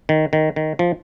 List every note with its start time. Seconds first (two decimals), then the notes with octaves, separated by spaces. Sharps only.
0.09 D#3
0.33 D#3
0.56 D#3
0.79 F3